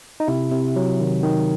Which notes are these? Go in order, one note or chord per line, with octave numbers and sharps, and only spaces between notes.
D#4
C3 E4
C3
F#3
D#3
D#3